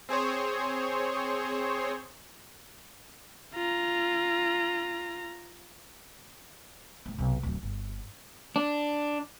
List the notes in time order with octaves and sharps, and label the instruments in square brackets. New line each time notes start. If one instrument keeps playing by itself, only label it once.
[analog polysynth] C4 G#4 C5 C#5
[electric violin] F4 A#5
[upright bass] A#1 G#3
B1 C3
D1 F#3
G1
[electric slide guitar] D4